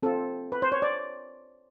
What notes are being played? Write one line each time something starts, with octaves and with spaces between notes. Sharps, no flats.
C4 F4 A4
B4
C5
C#5
D5